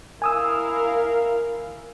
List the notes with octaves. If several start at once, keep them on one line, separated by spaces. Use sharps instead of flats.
E4 A#4 F5 G#5 D#6 E6